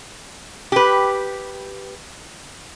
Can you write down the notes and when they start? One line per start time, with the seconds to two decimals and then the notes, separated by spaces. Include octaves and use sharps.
0.72 G4 B4